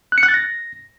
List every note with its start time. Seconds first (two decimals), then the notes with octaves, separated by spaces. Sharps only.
0.12 F#6
0.18 C#7
0.23 F#6
0.28 A6
0.34 A#6